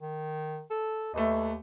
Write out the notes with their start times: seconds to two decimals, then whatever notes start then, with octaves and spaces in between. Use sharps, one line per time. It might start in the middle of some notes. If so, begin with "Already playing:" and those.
0.01 D#3
0.70 A4
1.14 D#2 A3 B4 D#5